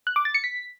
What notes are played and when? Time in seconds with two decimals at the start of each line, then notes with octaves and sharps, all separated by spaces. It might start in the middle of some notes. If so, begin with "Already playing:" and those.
0.07 F#6
0.16 D6
0.25 A6
0.34 C#7
0.44 B6